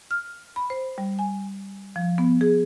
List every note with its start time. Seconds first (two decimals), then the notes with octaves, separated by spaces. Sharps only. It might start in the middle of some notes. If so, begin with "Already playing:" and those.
0.11 F6
0.56 B5
0.70 C5
0.98 G3
1.19 G#5
1.96 F3
2.18 B3
2.41 G#4